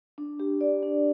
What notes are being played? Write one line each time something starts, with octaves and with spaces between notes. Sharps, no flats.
D4
G4
D5
D4